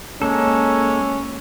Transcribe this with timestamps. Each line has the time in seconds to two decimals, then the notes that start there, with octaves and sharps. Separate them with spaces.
0.22 G#3 A#3 C#4 A4